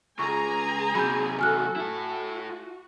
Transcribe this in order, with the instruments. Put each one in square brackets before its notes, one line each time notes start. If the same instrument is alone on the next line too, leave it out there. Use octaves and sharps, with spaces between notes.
[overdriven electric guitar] C#2 [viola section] G#4 G#5 A#5 [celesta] C#6
[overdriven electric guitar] C3 F#3 [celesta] B5 G6
[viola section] F#4 A4 [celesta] G#5 F6 F#6
[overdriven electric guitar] E4 A4 [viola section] F#4